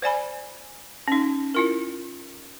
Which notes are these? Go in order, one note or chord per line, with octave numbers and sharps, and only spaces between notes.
C5 D5 G#5 B5
C#4 D#4
E4 F4 A#4